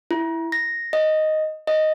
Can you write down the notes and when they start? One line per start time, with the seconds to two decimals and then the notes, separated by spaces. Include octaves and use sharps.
0.11 E4
0.52 A#6
0.93 D#5
1.67 D#5